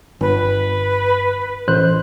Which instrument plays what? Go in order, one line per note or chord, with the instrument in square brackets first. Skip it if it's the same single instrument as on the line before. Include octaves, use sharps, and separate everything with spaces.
[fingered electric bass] G1 [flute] B4
[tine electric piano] A1 C5 F#6